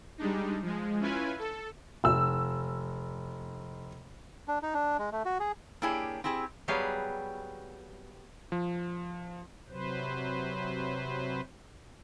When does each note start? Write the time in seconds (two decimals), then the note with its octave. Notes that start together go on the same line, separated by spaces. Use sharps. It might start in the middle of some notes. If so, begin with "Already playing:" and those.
0.18 G3 G#3 D4 D#4
0.62 F3 G#3
1.00 C#4 E4 F4 B4 G#5
1.39 A4
2.04 F1 E6
4.48 D4
4.62 D#4
4.74 D4
4.99 G#3
5.12 A3
5.25 F#4
5.40 G#4
5.82 A#3 D4 E4 G4 G#4 C#5
6.24 C4 E4 G4 G#4
6.68 F#3 G3 B3 G4 G#4 F5
8.52 F3
9.69 C3 F#3 B4 C5